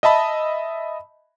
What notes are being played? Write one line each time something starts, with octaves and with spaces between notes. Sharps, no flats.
D#5 E5 A5 B5